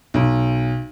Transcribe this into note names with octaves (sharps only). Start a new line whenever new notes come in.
B1